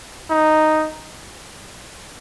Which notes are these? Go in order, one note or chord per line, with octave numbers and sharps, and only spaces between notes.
D#4